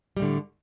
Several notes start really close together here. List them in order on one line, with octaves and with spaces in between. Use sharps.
G3 A2 D3